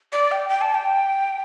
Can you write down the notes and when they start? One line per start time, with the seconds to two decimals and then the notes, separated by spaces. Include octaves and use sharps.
0.12 D5
0.31 G5
0.49 G5
0.61 A5
0.74 G5